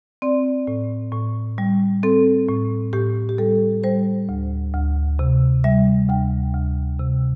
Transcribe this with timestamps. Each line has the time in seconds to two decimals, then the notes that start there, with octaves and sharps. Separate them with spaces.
0.22 C4 D5
0.67 A2
1.12 A2
1.58 G3
2.03 C4 A4
2.48 A2
2.93 A2 G4
3.29 G4
3.38 G3 A4
3.84 G3 C5
4.29 D2
4.74 D2
5.19 C3
5.64 G3 E5
6.09 D2 G5
6.54 D2
6.99 C3